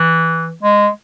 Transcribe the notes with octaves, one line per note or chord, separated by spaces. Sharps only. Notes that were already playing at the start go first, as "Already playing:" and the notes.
Already playing: E3
G#3